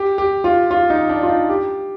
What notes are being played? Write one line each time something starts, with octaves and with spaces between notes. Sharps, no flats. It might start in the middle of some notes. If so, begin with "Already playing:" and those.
Already playing: G4
G4
F4
F4
D#4
D4
F4
D#4
G4